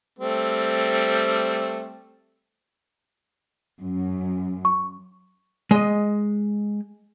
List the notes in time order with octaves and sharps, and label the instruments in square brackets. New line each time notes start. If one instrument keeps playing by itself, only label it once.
[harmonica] G3 A3 C4
[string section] F#2
[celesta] C#6
[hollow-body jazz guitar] G#3 D#5